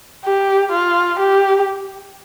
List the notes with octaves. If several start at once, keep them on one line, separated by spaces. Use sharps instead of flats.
G4
F4
G4